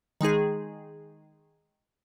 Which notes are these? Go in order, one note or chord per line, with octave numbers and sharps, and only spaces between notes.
D#3 G#3 D#4 G#4